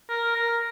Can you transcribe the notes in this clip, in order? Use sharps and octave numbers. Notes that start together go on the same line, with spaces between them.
A#4
A#4